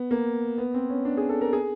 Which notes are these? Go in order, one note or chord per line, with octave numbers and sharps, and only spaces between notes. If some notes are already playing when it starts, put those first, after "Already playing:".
Already playing: B3
A#3
B3
C4
C#4
D4
G#4
A4
A#4
G#4